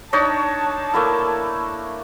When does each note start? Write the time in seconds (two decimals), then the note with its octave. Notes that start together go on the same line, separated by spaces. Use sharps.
0.13 D4 D#4 C#5 A5
0.94 A3 A#3 E4